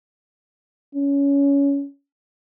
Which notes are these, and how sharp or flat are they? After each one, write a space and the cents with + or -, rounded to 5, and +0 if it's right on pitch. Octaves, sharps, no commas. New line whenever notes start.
C#4 +20